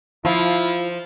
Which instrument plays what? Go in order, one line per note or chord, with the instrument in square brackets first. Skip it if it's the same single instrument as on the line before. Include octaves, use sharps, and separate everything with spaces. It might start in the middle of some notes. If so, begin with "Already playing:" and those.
[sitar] F3 [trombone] E4 [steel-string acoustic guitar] F4